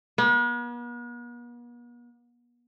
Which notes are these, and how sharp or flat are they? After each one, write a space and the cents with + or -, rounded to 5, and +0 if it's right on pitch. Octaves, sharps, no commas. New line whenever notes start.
B3 -45